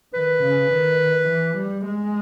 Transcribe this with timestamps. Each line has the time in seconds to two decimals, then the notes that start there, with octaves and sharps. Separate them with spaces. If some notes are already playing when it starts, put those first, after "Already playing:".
0.13 D#3 B4
0.42 C#3
0.71 D#3
1.28 E3
1.57 G3
1.85 G#3